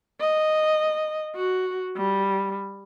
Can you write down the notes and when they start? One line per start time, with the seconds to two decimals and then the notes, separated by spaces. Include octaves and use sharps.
0.20 D#5
1.36 F#4
1.97 G3